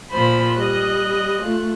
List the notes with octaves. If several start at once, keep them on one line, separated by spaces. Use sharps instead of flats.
A#2 F3 C5 B5
G3 D#5 F#6
A3 F4